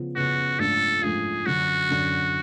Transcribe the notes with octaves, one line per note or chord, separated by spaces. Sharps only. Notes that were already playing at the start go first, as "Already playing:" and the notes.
Already playing: C#3 F3 B3
C#3 F3 B3 F#4
G#2 F3 A3 D4 F4 A4
G#2 F3 A3 D4 F4 G#4
F#2 D3 F#3 C#4 F#4
F#2 D3 F#3 C#4